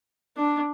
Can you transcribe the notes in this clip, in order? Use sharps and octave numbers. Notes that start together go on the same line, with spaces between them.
D4